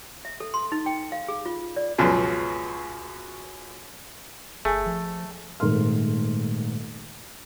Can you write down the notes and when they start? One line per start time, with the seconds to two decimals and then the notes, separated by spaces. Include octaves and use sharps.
0.25 E5
0.40 A4
0.54 C6
0.72 D#4
0.86 G5
1.12 F5
1.28 G#4
1.46 F4
1.76 D5
1.98 C#2 F#2 B2 F3 F#3
4.65 G1 A3 G#4
4.86 F3
5.60 D#1 G#2 A3 A#4 C6 F6